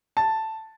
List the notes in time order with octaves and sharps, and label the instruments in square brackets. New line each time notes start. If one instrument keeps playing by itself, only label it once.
[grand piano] A5